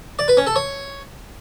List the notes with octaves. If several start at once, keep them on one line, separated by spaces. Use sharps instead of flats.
D5
B4
C#4
A4
C#5